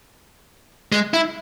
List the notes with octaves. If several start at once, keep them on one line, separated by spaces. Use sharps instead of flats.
G#3
E4